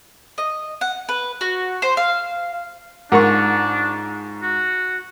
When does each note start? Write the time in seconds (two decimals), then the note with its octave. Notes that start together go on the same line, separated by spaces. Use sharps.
0.38 D#5
0.81 F#5
1.09 B4
1.41 F#4
1.82 C5
1.97 F5
3.12 G#2 D4 F4 A#4 F#5 C#6
4.43 F#4